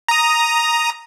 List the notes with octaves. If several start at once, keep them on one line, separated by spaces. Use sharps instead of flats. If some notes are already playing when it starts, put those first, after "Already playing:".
A#5 D#6